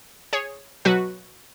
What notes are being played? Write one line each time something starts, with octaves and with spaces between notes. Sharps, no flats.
G#4 C#5
B2 F#3 F#4 B4